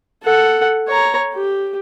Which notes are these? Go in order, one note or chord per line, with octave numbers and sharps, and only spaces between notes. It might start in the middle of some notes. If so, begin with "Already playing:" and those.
A4 F#5
C#5 A#5
G4